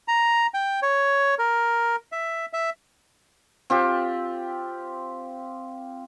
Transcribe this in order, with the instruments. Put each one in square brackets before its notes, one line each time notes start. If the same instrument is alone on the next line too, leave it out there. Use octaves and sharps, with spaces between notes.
[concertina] A#5
G5
C#5
A#4
E5
E5
[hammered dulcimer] C4 F4 G4